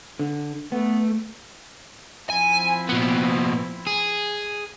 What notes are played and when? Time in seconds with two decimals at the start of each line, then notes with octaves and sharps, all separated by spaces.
0.19 D3
0.72 A3 B3
2.30 F3 C4 E4 G#5
2.89 A#2 B3
3.87 G#4